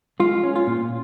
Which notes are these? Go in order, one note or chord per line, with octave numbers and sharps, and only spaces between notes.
G#3 F4
C#4
F4
A#2